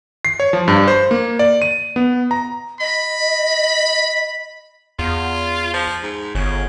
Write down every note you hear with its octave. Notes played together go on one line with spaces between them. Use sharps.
C7
C#5
F3
G2
C5
A#3
D5
D#7
B3
A#5
D#5 B5
E2 F4
F3
G#2
G1 C#3